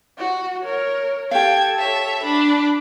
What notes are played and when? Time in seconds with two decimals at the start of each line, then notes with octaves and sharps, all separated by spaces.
0.18 F#4
0.64 A#4 C#5
1.31 G4 A4 F5 G5 G#6
1.78 C#5 E5
2.23 D4 B5